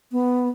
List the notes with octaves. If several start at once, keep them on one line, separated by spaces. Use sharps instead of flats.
B3